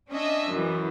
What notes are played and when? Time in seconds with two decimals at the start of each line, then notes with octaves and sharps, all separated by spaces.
0.10 C#4 D4 D#5 E5
0.51 F#2 E3